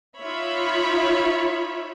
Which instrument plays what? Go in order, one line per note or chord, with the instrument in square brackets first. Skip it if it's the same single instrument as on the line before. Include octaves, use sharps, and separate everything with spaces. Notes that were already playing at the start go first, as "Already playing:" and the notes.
[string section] D#4 F4 C#5 E5 B5